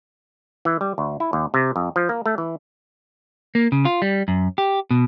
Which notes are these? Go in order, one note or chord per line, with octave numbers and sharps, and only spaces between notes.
E3
G3
D2
E4
D#2
C3
F2
F3
A#3
A3
E3
A#3
C#3
F4
G3
F#2
G4
B2